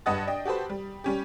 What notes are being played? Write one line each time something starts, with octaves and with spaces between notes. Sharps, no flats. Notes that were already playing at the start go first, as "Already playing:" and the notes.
G2 B4 D#5 F#5 D#6 A6
D4 D#5 G5
F#4 G4 A4 B4 C5
G3
G3 C#4 G4